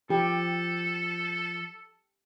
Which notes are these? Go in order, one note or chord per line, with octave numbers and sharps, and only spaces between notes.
F3 G4 A4